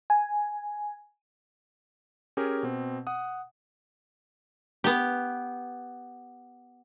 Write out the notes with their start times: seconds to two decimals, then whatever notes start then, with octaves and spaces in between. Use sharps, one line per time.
0.10 G#5
2.37 C#4 G4 G#4 A#4
2.63 B2 C4
3.07 F#5 D#6
4.84 B3 G4